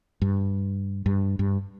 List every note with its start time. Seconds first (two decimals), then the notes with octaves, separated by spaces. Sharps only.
0.22 G2
1.06 G2
1.39 G2